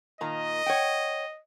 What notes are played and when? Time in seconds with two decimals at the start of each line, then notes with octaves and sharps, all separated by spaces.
0.21 A#2 D#3 D#5 A#5
0.66 C#5 F#5 G5